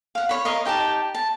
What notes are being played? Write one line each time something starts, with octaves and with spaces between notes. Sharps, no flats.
F5 F#5
C#5 B5
A#4 C#5 D#5 F5
D#4 G4 G5 A5
A5